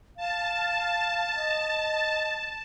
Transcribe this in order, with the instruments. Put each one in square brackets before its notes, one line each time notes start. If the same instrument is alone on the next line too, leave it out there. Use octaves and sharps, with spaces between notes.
[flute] F5 [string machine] A5
[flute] D#5